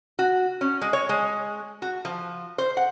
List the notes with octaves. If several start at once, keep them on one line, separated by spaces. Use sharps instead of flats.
F#4
C#4
G#3
C#5
G#3
F#4
F3
C5
F#5